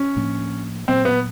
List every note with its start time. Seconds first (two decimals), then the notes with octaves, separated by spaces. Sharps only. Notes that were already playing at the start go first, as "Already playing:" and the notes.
Already playing: C#4
0.16 A2 F3 A#3 D4
0.88 A#2 F#3 A#3 C4
1.05 B3